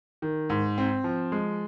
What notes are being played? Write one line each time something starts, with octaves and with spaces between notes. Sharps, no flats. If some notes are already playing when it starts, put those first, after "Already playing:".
D#3
G#2
C4
F3
G#3